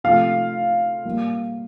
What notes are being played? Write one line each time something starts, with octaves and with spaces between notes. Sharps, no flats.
C3 F3 A3 F4 F5
A#2 G3 A#3